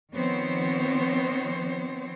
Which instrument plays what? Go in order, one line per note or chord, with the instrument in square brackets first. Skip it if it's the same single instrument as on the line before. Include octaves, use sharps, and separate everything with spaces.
[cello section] D#3 F3 B3 C4 C5 C#5